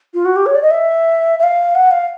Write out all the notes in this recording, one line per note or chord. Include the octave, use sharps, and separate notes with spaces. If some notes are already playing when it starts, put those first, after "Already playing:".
F4
F#4
G4
C#5
D5
D#5
E5
E5
F5
F#5
F5